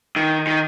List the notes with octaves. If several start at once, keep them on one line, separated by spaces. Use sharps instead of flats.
D#3
D#3